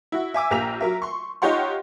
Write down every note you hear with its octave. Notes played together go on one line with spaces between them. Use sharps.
E4 F#4
E5 G#5 D6 E6
A#1 A#3 G4 A#5 B6 F7
F#3 A#4 E5
C6 C#6
D#4 F4 G4 C#5 F#5 C6